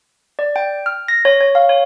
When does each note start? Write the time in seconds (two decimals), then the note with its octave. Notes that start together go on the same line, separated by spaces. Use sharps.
0.39 D5
0.56 G5
0.86 F6
1.08 A#6
1.25 C#5
1.41 C#5
1.55 F5
1.69 C#5